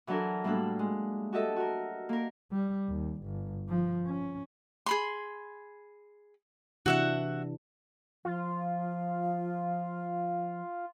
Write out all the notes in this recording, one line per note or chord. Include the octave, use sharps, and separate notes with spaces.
E3 F#3 D4 A4 A#4
A2 G3 A#3 D4 A4 F#6
G#3
F#4 G4 A4 D#5 E5 A5
F#4 A#4
A#3 A#4
G3
D#2
G1
F3
C#4
G#4 B5 C6
C3 E3 D4 F#4 E5 F#5
F3 F4